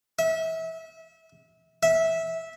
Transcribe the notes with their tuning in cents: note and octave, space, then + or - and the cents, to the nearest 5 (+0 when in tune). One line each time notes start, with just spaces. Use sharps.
E5 -30
E5 -15